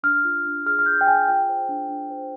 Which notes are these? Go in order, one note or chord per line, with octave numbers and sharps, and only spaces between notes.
D4 F6
F4
D4
G#4 F6
F6
G#4 G6
G5
G#4 G#5
F4 G5
C5
D4
D4
C5